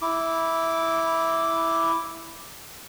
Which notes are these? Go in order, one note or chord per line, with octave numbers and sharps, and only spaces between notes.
E4 D6